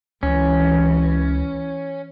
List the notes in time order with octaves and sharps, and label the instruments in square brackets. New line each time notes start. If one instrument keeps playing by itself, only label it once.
[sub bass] C#2 [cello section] E3 [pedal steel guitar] C#4